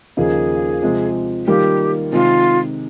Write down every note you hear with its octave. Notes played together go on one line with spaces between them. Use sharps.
D#2 C#3 F3 A#3 D#4 G#4
C3 F3 G#3
D#3 G3 A#3 F4 G4 A#4
C3 D#3 G#3 F4